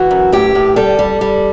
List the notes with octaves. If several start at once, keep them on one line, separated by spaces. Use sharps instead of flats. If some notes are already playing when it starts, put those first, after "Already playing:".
Already playing: E3 F#4
F#2
A2 G4
A2
G3 A4
G3
G3